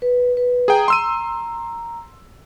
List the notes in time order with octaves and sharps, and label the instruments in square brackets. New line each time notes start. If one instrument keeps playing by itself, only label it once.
[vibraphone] B4
B4
[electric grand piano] G#4 G5 [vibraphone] A#5
[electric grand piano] C6 E6 D#7